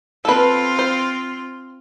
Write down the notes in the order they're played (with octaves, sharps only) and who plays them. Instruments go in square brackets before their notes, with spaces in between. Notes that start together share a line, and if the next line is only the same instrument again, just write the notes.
[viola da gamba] C4 F4 [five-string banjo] A4 B4
[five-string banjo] C5